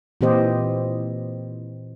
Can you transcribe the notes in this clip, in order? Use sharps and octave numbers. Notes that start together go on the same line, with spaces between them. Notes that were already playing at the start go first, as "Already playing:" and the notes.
A#2 E3 C4 G4 C5 D#5